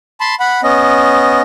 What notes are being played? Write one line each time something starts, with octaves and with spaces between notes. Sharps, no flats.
A5 B5 C6
F#5 B5
B3 C#4 D#5